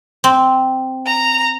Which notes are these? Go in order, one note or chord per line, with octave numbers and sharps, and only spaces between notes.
C4
A#5